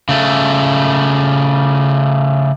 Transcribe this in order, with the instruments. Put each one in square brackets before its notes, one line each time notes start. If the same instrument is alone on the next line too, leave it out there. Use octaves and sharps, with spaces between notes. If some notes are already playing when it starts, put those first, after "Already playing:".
[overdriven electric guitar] C#3 A3